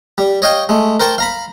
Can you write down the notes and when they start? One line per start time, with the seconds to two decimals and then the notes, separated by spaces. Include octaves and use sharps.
0.18 G3
0.42 C#5 D#5 F5 G5
0.69 G#3 A3
1.00 A#4 C5 G5 A5 C#6
1.18 F5 A#5 B5